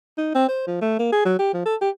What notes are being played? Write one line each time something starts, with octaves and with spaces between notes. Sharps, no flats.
D#4
C4
C5
F3
A3
A#3
G#4
F#3
G4
F3
A4
G4